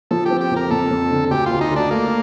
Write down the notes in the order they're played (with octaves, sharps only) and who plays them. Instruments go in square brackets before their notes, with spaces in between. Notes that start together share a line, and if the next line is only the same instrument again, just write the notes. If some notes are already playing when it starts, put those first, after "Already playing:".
[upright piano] F3 [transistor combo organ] A4
[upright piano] C4 [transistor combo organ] G4
[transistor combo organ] G4
[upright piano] F2
[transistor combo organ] A#4
[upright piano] F2 [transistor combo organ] A4
[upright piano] F2
D3
[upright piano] D2 [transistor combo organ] G4
[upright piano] D2 [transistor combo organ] F4
[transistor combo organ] D#4
[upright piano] D2
[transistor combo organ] D4
[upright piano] A3 [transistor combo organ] A#3